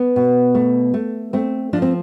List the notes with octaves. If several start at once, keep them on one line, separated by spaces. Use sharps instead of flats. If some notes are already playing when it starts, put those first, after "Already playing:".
Already playing: B3
B2
A3
A3
A3 C4
F3 D4
C4